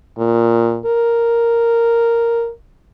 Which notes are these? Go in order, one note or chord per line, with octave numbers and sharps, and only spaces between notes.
A#2
A#4